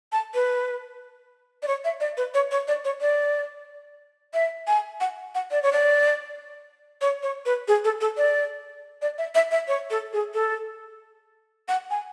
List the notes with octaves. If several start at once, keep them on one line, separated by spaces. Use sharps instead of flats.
A5
B4
D5
C#5
E5
D5
B4
C#5
C#5
D5
C#5
D5
E5
G#5
F#5
F#5
D5
C#5
D5
C#5
C#5
B4
G#4
A4
A4
D5
D5
E5
E5
E5
C#5
A4
G#4
A4
F#5
G#5